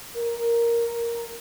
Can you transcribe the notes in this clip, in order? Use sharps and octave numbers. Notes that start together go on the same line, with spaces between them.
A#4